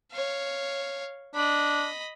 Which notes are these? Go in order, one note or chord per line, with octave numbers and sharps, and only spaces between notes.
C#5 F5
D4 D#5 B5